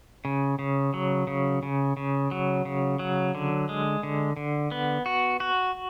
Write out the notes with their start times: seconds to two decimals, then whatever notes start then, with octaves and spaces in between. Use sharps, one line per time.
0.25 C#3
0.59 C#3
0.94 F#3
1.27 C#3
1.63 C#3
1.97 C#3
2.31 F#3
2.65 C#3
2.99 F#3
3.35 D3
3.69 G#3
4.03 D3
4.37 D3
4.71 B3
5.06 F#4
5.40 F#4